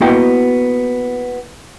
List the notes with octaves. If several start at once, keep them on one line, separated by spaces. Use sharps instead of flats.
A#3 B3 E4 F#4 D#5 G5